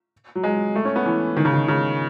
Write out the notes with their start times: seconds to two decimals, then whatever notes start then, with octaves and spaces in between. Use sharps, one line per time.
0.35 F#3
0.44 G#3
0.76 A3
0.85 C#4
0.96 B3
1.06 E3
1.37 D#3
1.45 C#3
1.53 D#3
1.68 C#3